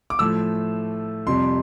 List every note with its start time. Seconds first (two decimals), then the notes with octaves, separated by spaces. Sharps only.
0.10 D6
0.19 A2 F3 A3 E6
1.27 F2 C3 G3 C6